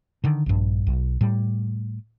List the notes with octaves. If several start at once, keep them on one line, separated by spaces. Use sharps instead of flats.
D3 D#3
A#1 G2
B1
A2 G3